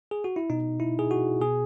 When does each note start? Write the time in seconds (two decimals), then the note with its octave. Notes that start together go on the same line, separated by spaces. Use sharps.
0.11 G#4
0.24 F#4
0.36 E4
0.50 B2 D#4
0.80 E4
0.99 G#4
1.11 F#4
1.41 B2 G#4